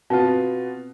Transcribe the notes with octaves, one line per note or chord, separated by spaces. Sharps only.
B2 B3 C4 F4